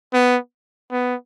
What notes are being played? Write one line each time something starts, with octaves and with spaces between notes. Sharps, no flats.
B3
B3